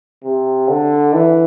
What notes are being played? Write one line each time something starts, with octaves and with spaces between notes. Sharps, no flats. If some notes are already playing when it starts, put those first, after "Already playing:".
C3
D3
E3